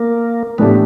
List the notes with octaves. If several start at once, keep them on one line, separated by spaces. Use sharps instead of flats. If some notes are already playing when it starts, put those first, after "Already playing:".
Already playing: A#3
A2 E3 A3 B3 D4 G4